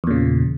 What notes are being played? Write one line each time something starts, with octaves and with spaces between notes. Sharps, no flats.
E2 A#2 C#3